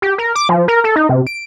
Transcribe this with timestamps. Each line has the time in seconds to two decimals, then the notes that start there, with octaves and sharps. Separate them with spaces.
0.02 G4
0.18 A#4
0.35 D6
0.49 F3
0.68 A#4
0.84 A4
0.96 D#4
1.09 C3
1.27 D7